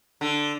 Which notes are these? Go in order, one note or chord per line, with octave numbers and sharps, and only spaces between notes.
D3